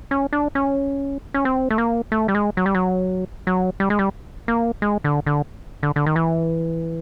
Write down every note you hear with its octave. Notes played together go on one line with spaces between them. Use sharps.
C#4
D4
C#4
C#4
C4
A3
A#3
A3
G3
G#3
F#3
G3
F#3
F#3
G3
G#3
G3
A#3
G#3
D3
D3
D3
D3
D#3
E3